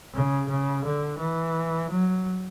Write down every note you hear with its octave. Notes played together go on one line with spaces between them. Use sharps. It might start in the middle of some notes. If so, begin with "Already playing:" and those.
C#3
C#3
D3
E3
F#3